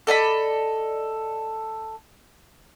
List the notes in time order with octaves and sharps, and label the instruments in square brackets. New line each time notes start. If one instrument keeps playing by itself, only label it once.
[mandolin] A4 D5 D#5 B5